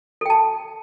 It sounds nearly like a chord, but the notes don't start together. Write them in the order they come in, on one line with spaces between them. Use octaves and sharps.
A4 G5 A5